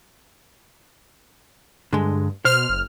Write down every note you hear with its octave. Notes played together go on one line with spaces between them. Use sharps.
G2 D3 G#3
B2 C5 F6
F#1